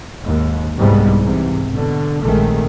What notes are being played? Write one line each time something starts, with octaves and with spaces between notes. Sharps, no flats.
D#2 G#2
C2 G#2 C3 G3 B3
G#2 C3 E3
B2 D3
A#1 C3 D#3 G#3 A3